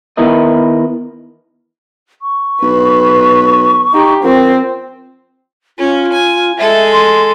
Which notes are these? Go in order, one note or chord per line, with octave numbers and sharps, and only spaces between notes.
D#3 B3 E4 A#4 D#5
C#6
B1 B4
D#4 G4
F3 C4 A#4
C#4 F4
G#5
G#3 A4 E5
C6